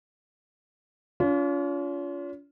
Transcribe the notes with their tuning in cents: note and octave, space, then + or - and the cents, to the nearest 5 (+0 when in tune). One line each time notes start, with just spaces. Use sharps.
C#4 +45 F4 +0